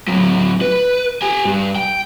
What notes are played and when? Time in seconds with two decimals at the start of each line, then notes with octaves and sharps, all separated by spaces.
0.08 A2 F#3
0.61 B4
1.22 G4 G#5
1.45 G2
1.76 G5